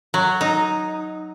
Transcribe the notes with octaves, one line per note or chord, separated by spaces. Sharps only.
F#3
D#4